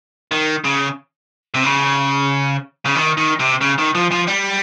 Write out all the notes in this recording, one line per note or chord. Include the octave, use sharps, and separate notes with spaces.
D#3
C#3
C3
C#3
C#3
D#3
D#3
C3
C#3
D#3
F3
F3
G3